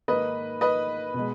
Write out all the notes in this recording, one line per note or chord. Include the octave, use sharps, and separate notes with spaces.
G#2 D#3 A#3 B4 D#5
B4 D#5
B2
G#3